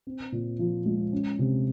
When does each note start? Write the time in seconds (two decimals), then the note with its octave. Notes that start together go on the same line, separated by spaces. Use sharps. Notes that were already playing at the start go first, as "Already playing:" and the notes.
0.07 C4
0.32 A#2
0.59 F3
0.86 G#3
1.12 C#4
1.39 C3